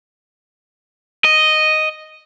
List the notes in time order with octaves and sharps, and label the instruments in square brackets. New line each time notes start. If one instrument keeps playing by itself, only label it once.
[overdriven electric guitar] D#5